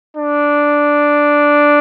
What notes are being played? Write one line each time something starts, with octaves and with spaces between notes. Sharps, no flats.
D4